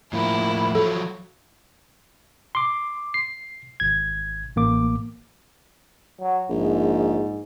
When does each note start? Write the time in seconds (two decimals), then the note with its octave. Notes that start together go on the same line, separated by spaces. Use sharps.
0.13 A2 F3 A#3 E4
0.75 F3 F#3 A4
2.55 C6 D6
3.14 C7
3.80 G#1 G#6
4.56 A1 A#3 D6
6.21 F#3
6.49 A#1 G#2